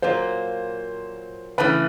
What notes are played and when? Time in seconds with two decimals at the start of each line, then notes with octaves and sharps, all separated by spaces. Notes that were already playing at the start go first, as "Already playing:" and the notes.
0.02 A#2 F#3 A#3 C5
1.58 C#3 E3 A3 B4